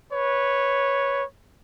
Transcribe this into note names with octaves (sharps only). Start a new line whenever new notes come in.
B4 C#5